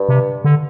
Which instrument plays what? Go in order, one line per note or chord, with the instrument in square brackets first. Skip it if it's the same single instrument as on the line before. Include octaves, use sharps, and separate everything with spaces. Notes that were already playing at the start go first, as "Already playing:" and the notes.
Already playing: [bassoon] G2
[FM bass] C3
D3